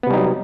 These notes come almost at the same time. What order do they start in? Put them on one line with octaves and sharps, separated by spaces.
B3 C3 G3 D#4 F#3